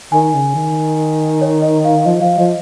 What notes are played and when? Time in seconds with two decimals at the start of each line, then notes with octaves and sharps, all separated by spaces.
0.12 D#3 G#5
0.34 C#3
0.55 D#3
1.41 C#5
1.62 D#5
1.85 F5
2.05 F3 D#5
2.21 F3 F5
2.38 F3 D#5